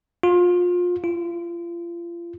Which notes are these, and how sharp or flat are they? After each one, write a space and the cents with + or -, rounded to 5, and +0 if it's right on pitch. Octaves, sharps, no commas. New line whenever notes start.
F4 +25
F4 -35